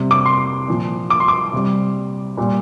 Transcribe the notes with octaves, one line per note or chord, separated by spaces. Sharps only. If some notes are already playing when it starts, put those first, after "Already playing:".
Already playing: C3 G3
D6
C6
A#2 F3
D6
C6
D6
C3 G3
A#2 G3